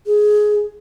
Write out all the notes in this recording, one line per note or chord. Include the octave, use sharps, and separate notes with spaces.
G#4